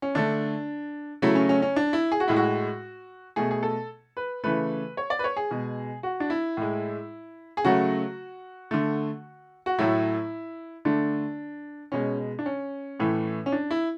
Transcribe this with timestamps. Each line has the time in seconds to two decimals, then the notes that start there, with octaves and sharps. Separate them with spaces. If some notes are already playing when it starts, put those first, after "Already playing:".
0.02 C#4
0.15 D3 A3 D4
1.22 C#3 F#3 A3 E4
1.35 C#4
1.49 C#4
1.62 C#4
1.76 D4
1.93 E4
2.12 G#4
2.20 F#4
2.28 A2 G#3 E4
2.36 F#4
3.36 B2 A3 G#4
3.51 G#4
3.63 A4
4.17 B4
4.44 C#3 E3 A3 B4
4.97 C#5
5.10 D5
5.19 B4
5.24 C#5
5.36 G#4
5.51 B2 G#3
6.03 F#4
6.20 D4
6.30 E4
6.57 A2 G#3
7.57 G#4
7.64 C#3 F#3 A3 F#4
8.71 D3 A3
9.66 F#4
9.79 A2 F#3 A3 E4
10.85 D3 A3 D4
11.92 B2 G#3 C#4
12.39 D4
12.46 C#4
12.99 A2 E3 A3
13.46 C#4
13.52 D4
13.71 E4